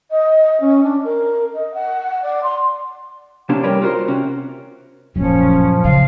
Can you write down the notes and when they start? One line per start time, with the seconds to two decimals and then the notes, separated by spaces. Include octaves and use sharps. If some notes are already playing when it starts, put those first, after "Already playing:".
0.11 D#5
0.60 C#4
0.83 D4
1.04 A#4
1.54 D#5
1.74 F#5
2.23 D5
2.43 C6
3.49 C3 A#3 C#4 D4 G4 C5
3.63 G3 G4 A#4 B4 C#5 D5
3.82 F4 F#4 A#4 C5
4.08 C3 C#4 F#4
5.16 D1 F#2 A#2 F3 C#4
5.84 C#3 F5